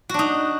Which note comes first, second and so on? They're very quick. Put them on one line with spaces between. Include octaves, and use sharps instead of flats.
F#4 D4 D#4